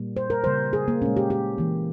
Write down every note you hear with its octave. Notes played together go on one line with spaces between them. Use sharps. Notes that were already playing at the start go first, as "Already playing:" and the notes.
Already playing: A#2 G3 A#3
C5
A#4
C#3 G3 A#3 C5
G#4
A#3
A#2 G#3 C#4
G4
G4
E3 A#3